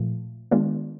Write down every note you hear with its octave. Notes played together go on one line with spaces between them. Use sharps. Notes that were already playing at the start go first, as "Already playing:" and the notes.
Already playing: A#2 F3 A3
D#3 G#3 B3 D4 F4